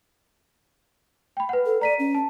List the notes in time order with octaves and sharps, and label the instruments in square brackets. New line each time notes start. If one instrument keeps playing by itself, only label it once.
[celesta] G5 B5
B4 F#5
[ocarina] A4
[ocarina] D5 [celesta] A#5 B6 D#7
[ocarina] C#4
[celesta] A5